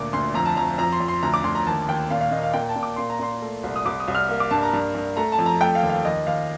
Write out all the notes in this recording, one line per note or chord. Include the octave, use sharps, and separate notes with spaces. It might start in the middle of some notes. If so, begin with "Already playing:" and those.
Already playing: D2 A#2 D6
D2 C6
F2 A#5
A5
F2 A#5
F2 A#5
C6
F2
C6
D2 A#5
D6
D2 C6
A#5
D#2 A5
D#2 G5
A#2 F5
F5
A#2 D#5
F5
A#2 G5
A5
A#2
D6
A#2 C6
A#5
A#2 C6
A3
C2
D#6
C2 D6
D#6
C2
F6
A#3
D6
G2 A5
A#5
G2
G2
A3 A#5
A5
F2
A#5
A3 G5
F5
D#2
F5
D#2 D#5
D#2 F5